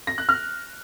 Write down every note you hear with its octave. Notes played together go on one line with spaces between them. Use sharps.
A#6
F#6
F6